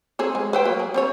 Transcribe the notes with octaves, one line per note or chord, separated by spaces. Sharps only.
C4 G#4 A4
G#3
B4 C5 G5
F#3 A#3
G#4
C4 D4 C#5